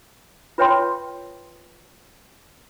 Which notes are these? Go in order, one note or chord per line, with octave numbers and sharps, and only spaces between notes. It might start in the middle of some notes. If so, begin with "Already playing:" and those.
F4 B4 C#5 E5 G5 C6